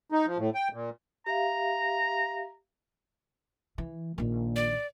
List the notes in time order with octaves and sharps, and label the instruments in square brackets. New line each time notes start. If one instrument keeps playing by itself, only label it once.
[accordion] D#4
F3
A2
G5
A#2
[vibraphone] G4 E5 F5 [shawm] A#5
[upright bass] E3
[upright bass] A#1 D#3 [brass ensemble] A#2
[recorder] D5